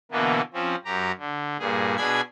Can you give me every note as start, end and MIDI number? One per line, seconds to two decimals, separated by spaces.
0.11 0.41 47
0.11 0.41 50
0.11 0.41 52
0.11 0.41 58
0.11 0.41 59
0.53 0.75 53
0.53 0.75 60
0.53 0.75 61
0.85 1.12 42
0.85 1.12 67
0.85 1.12 82
1.19 1.57 50
1.59 1.96 43
1.59 1.96 46
1.59 1.96 68
1.97 2.21 47
1.97 2.21 62
1.97 2.21 68
1.97 2.21 80
1.97 2.21 83
1.97 2.21 92